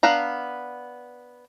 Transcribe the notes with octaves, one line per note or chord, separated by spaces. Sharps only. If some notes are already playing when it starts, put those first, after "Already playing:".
B3 D4 B4 F5 A#5